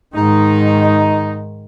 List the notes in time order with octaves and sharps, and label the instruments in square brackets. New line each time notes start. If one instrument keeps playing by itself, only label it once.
[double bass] G#2 D#3 [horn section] D#4